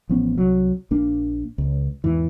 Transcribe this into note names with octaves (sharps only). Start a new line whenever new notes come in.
A1 F3 B3 C#4
C2 F#3
A#1 A#3 D4
C#2
E2 G#2 E3